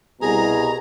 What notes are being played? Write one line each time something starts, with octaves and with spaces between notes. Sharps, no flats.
C2 B2 G#4 A#5